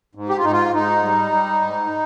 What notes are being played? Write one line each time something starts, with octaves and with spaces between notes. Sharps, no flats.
G#2
G4
F4
G#2 D#4
F4
G#2 D#4
G3
G3
G#2